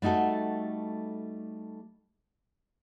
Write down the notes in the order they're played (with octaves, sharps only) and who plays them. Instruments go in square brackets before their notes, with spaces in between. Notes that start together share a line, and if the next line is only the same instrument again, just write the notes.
[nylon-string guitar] G3 A3 D#4 F#4 A4